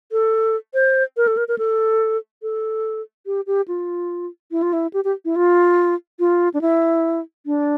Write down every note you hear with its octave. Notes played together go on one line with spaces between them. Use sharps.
A4
C5
A#4
A4
A#4
A#4
A4
A4
G4
G4
F4
E4
F4
E4
G4
G4
E4
F4
F4
D4
E4
D4